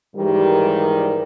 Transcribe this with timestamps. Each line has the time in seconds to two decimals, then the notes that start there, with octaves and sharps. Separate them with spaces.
0.16 G#2 D#3 E3 G3